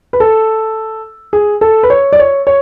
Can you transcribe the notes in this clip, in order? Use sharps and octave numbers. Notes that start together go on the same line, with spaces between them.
B4
A4
G#4
A4
B4
C#5
D5
C#5
C#5